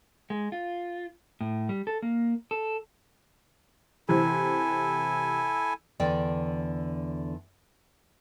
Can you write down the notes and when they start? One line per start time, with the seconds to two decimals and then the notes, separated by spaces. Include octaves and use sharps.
0.30 G#3
0.52 F4
1.41 A2
1.69 G3
1.87 A4
2.02 A#3
2.51 A4
4.09 C3 E3 C4 E4 A4 G#5
6.00 E2 D3 D5 G5